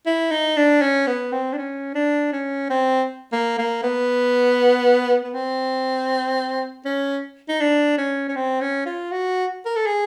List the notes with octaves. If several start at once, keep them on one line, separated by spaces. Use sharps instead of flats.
E4
D#4
D4
C#4
B3
C4
D4
C#4
D4
C#4
C4
A#3
A#3
B3
B3
C4
C#4
D#4
D4
C#4
C#4
C4
C#4
F4
F#4
A#4
A4
G#4